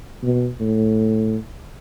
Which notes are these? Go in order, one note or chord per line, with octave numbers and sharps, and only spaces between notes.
B2
A2